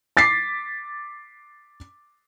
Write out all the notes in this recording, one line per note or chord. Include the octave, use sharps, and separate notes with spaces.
D6 A6 B6 C7